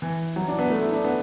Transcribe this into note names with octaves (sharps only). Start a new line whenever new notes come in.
E3
F#3
D4
B3
A3
E4
D4
B3